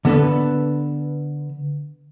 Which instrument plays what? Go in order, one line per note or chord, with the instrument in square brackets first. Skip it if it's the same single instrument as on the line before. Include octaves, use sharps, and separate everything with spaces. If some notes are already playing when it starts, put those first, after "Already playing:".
[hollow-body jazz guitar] D3 B3 A4 B4